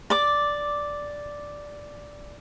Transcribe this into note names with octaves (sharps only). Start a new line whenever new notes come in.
D5 D6